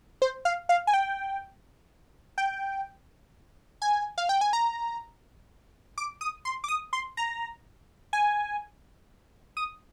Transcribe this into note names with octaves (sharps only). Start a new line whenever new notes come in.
C5
F5
F5
G#5
G5
G5
G#5
F5
G5
G#5
A#5
D6
D#6
C6
D6
D#6
C6
A#5
G#5
D#6